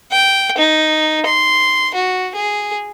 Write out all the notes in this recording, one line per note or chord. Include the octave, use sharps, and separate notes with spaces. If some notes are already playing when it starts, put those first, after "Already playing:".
G5
D#4
C6
F#4
G#4